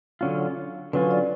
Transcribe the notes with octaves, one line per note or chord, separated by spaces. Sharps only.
D3 F#3 C#4 F4
D3 F#3 C#4 F4 B4
D5